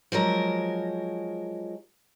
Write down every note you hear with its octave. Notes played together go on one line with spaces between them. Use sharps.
F3 F#3 G#3 A#4